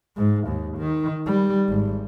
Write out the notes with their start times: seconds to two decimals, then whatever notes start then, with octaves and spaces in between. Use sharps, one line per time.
0.17 G#2
0.47 D#2
0.78 D#3
1.26 G3
1.69 G#1